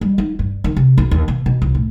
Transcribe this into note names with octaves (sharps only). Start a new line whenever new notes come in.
G3
D#4
G2
D#3
C3
B1
D#2
B2
B2
C2
A2